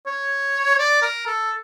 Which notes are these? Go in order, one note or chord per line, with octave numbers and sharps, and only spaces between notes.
C#5
D5
A#4
A4